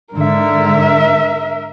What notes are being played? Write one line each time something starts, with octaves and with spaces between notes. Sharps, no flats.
G#2 D3 A#4 E5